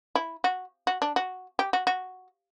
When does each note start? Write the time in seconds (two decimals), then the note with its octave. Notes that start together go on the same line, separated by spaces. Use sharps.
0.15 E4
0.44 F#4
0.87 F#4
1.02 D4
1.16 F#4
1.59 G4
1.73 F#4
1.87 F#4